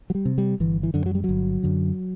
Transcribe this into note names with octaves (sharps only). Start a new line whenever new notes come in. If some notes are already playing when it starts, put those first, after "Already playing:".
F#3
G3
C3
G3
G1 E3
E3
F#2 D3
F#3
G3
G1 F#3
F#2 D3